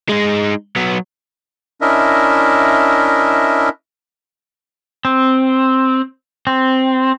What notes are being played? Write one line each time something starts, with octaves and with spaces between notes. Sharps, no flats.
G#3 D#4
F#3 B3
C#4 D4 E4 A#4 D#5 E5
C4
C4